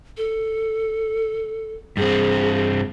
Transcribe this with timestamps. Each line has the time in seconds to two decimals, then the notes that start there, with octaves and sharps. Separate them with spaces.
0.17 A4
1.97 G2 C4 G#4